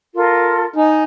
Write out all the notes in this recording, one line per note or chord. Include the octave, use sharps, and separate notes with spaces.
F4 A4 A#4
D#4 G#5